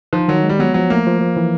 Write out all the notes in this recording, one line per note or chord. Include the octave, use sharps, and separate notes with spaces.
F3 D#4
D#3 F#3
G#3
G3
F#3 B3
F3 F#3
A3 A#3
F3
F3
E3